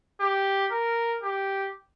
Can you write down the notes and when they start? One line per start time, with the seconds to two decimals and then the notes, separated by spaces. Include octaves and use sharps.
0.20 G4
0.71 A#4
1.22 G4